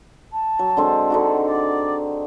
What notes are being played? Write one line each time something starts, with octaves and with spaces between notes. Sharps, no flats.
A5
F#3
D3 G#3 C4
D3 D#4 F#4
D5